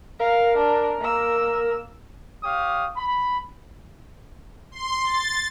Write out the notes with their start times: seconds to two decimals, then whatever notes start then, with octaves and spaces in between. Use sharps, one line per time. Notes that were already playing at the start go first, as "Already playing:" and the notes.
0.20 A#4 F5
0.58 D4
1.01 A#3 E6
2.44 G4 C#5 F5 D#6
2.97 B5
4.72 C6
5.05 A6